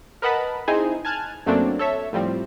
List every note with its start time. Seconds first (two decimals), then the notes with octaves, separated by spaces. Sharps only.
0.22 A#4 B4 D#5 F#5 A5 B5
0.68 C4 D#4 E4 G#4 C5 G#5
1.05 G#5 A5 F6 F#6 G#6
1.46 F#2 F#3 A3 A#3 C4 D4
1.79 A4 C#5 E5
2.13 A2 F3 G3 C4